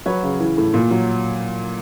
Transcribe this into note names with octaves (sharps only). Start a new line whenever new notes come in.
F#3 B4 C#5
C#3
E3
A2
A#2
F#3